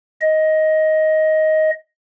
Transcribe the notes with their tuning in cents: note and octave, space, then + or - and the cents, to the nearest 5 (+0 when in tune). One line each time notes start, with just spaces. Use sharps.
D#5 +10